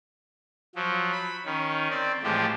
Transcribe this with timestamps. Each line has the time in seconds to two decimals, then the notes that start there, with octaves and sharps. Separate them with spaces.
0.75 F3 F#3
1.12 B5
1.45 D#3 C#4
1.90 C4 D5
2.23 A2 E3 F3 G#3 G4